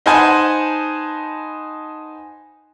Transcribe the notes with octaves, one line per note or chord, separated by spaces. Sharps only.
D#4 B4 C5 F#5 G#5 A5